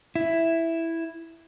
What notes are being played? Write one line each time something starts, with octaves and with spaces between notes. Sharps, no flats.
E4